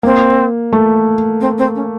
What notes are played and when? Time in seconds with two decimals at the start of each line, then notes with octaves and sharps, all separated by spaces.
0.03 A#3 C4
0.73 A3
1.40 C4
1.58 C4
1.75 C#4